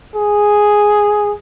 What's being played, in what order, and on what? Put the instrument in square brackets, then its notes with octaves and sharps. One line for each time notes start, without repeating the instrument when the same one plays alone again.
[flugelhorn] G#4